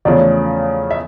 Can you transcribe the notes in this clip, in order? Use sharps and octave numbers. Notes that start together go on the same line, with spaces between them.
E2 C#3 F3 A3 C#4 D5
E5